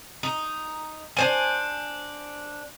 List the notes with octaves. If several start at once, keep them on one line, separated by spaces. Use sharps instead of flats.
D#4
D4 C5 G#5